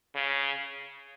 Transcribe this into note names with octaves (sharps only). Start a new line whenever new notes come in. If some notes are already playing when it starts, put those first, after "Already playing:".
C#3